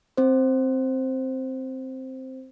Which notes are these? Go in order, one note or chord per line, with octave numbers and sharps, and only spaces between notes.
C4 C5